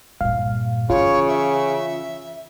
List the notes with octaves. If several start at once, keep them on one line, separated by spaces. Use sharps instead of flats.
G2 A#2 F5
C#3 E3 F4 C#5
E5